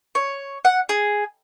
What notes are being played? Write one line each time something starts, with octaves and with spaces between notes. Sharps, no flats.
C#5
F#5
G#4